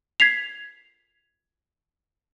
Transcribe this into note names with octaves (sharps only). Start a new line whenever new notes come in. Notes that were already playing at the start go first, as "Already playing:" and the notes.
G#6 B6 C7 F7